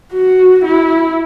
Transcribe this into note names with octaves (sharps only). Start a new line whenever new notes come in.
F#4
E4